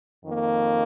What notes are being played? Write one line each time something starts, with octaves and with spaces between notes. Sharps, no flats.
F2 D#3 A#3